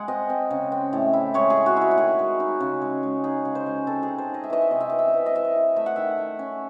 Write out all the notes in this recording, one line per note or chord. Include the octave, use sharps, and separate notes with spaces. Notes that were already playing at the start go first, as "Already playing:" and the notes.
Already playing: G#3 F#5 G#5
C4 D#5
C4
C#3
C4
A2
E4
G#3 C#5
G#4
G#3
F#4
E4 F#4
F#4
D#3 G#4
G#3
D#4
C#3
G#3
G#3
D#4 G#4
C#3
C5
G#3
C4 A4
G#4
D#4
C5
D#4 D#5
E5
E3 D#5
E5
C3 D#5
E5
E3 D#5
E5
D#5
E3 E5
D#5
E3 E5
D#5
E4
A3 E5
F#5
D#3 E5
A3
C#4